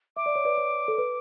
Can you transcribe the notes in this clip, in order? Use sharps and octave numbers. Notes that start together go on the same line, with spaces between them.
E5 D6
D5
C#5
B4 D5
C#5
A4
B4